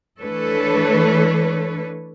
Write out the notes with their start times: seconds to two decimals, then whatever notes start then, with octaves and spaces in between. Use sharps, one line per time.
0.22 E3 A3 D4 A4 B4 C#5